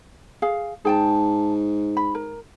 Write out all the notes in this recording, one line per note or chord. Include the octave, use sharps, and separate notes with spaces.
G#4 F5
G#2 G#4 G5 A5
B5
A#4